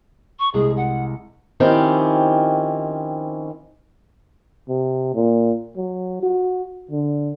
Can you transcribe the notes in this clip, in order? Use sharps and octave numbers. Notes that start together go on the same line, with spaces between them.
C#6
C2 G#3 G#4
F#5
D#3 F3 C4 C#4 E4 G4
C3
A#2
F#3
F#4
D3